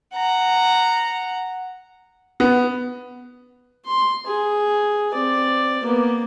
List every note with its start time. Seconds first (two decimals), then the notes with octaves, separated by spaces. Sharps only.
0.15 F#5 A#5
2.40 B3
3.86 C6
4.27 G#4
5.13 C4 D5
5.84 A#3 B3